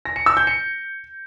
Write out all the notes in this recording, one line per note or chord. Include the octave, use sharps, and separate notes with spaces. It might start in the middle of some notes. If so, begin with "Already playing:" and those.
A#6
C#7
E6
G6
C#7